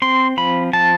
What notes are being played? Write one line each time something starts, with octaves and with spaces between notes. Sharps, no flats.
C4 C6
F3 B5
F3 A5